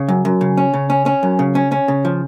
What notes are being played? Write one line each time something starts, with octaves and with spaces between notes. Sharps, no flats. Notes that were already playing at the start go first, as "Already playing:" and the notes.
Already playing: C#3
F#2
F#2
C#3
C#4
C#3
C#4
C#4
F#2
C#3
C#4
C#4
C#3
F3